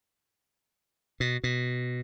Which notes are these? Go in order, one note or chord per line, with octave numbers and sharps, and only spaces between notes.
B2
B2